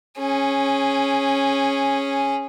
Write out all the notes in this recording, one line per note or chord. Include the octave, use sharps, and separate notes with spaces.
C#4 G#4